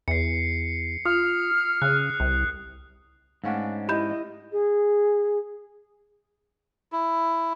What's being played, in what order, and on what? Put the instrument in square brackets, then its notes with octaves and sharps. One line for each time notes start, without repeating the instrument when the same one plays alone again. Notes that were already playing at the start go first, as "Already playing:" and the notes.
[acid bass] E2 [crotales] C7 C#7
[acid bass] F4 [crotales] D#6 [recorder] F6
[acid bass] C#3 [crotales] F#6
[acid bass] C2
[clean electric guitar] G#2 C#4 D4 [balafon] A3 F5 F#5
[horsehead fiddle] E4 D#5 [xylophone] G4 B5 G6
[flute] G#4
[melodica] E4